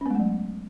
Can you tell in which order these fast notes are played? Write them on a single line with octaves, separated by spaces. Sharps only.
C#4 B3 G#3 A3 F#3